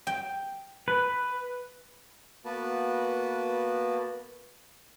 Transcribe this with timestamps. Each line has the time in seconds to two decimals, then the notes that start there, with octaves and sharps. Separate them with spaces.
0.07 G5
0.88 B4
2.45 A#3 B3 F#4 B4 A5